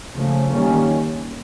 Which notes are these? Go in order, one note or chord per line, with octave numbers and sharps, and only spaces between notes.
C#3 F3 A3
D#3 G3 A#3 C#4